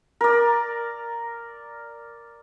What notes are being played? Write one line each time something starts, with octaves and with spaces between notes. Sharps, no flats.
A#4 D5